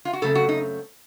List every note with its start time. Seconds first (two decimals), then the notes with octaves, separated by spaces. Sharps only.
0.05 F4
0.13 F#4
0.22 F#2 C#3 A3 C4 A4
0.35 F#4
0.49 D#4